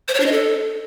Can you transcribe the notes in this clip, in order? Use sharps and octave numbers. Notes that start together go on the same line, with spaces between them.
C5
C#5
D4
D#5
A4